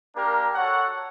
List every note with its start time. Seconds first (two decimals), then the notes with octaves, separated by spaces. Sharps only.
0.15 A#3 D4 G4 A#4
0.54 F#4 A4 C#5 F#5